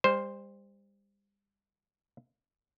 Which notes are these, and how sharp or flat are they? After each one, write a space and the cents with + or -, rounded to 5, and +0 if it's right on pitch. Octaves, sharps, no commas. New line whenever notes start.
G3 +35 C5 +0